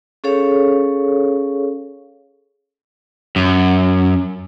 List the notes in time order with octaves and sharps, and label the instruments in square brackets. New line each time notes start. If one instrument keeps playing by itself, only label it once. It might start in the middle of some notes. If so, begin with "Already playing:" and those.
[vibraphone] C#4 G#4 A4 C#5 F5
[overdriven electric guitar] F#2